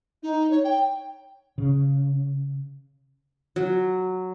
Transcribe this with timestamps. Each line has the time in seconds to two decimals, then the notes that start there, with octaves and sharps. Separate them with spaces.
0.23 D#4
0.51 C#5
0.64 G5
1.58 C#3
3.56 F#3